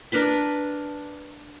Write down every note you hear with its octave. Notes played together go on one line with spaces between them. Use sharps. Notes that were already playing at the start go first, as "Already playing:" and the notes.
D4 A#4 B4 B5